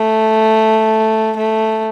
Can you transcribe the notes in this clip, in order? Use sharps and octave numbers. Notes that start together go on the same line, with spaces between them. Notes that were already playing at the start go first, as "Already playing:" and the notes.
Already playing: A3
A3